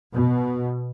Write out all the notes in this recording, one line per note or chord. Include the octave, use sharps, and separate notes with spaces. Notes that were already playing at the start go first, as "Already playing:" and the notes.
B2